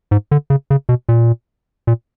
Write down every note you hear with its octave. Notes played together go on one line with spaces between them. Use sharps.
G#2
D3
C#3
C#3
B2
A#2
A#2